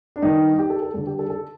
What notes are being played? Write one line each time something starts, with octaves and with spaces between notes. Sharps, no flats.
D4
G2 D#3 D#4
G4
A4
A4
G2 D3 A4
G4
A4
A4